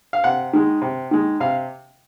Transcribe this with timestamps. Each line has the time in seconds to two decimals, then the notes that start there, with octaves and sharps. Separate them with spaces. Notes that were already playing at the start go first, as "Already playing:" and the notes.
0.13 F5
0.24 C3 F#5
0.53 D#3 G#3
0.82 C3
1.11 D#3 G#3
1.40 C3 F5